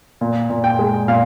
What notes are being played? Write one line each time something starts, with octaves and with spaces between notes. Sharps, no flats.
A#2
A#2
G5
G#3
A#2 F5